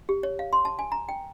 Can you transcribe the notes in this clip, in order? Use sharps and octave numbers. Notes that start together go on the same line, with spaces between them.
G4
C#5
F5
C6
A5
G#5
A#5
G5